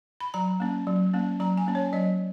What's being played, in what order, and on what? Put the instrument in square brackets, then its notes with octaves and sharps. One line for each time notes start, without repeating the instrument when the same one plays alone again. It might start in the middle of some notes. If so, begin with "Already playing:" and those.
[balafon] B5
F#3 A#5
A#3 C#4
F#3
A#3 C#4
F#3 A#5
G#5
A#3 C#4
C#5
F#3 D#5